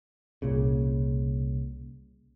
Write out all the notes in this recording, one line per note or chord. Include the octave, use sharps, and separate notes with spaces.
C2 A#2 C#3